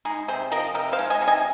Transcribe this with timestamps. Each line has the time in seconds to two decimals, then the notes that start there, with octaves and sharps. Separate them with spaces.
0.05 G#3 D#4 G#4
0.28 C3 G#4 C5
0.52 F3 A#4 D#5
0.74 C3 A#4 D#5
0.92 C5 F5
0.99 G#3
1.10 D#5 G#5
1.22 C3
1.27 D#5 G#5